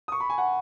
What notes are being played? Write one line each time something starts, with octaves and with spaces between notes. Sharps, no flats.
D#6
C#6
B5
G#5
F#5